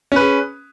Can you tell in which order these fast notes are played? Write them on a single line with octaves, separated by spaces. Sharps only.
C#4 B4 G#4